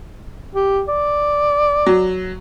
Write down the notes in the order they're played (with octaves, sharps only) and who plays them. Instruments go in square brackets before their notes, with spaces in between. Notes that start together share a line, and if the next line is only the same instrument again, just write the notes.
[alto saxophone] G4
D5
[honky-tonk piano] F#3